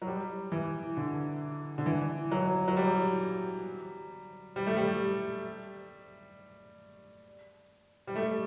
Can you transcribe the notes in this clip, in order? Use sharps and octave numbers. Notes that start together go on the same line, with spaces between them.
F#3
G3
E3
D3
D3
E3
F#3
F#3
G3
G3
A3
G3
G3
A3